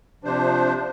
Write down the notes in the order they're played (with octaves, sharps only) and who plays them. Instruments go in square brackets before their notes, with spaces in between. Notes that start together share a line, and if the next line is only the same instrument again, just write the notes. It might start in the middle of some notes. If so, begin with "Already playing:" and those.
[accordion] C3 F3 D4 C5